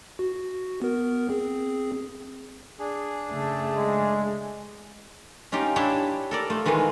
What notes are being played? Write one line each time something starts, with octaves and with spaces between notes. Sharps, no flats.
F#4
B3 A#4
C4 G#4
D4 G#4
C#3 A3
G#3
C#4 D#4 F4 G4
D4 E4 G4 C#5 G5 A5
A4 A#4 D5
A3 F4
D#3 E3 G#3 A3 F4